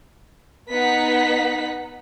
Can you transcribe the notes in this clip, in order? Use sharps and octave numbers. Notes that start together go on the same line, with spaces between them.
B3 D#4 F#5 B6